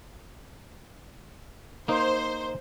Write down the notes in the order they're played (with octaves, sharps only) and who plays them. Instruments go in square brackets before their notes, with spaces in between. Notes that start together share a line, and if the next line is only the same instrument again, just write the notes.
[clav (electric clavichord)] A#3 D#4 [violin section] C5